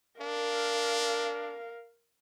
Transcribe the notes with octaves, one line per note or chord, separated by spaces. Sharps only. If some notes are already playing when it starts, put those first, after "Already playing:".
D4 A#4 F5